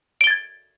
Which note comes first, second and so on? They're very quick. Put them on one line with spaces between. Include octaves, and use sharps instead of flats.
D7 G7 A6 G#6